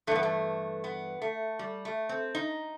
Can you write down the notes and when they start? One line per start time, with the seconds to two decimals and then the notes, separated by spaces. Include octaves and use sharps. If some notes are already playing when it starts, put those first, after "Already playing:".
0.07 G2 A3
0.11 E3 B3
0.23 A3
0.84 B3
1.22 A3
1.59 G3
1.85 A3
2.09 C4
2.35 D#4